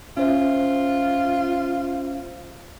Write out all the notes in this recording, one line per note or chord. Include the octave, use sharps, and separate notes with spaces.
C#4 F4 C5 E5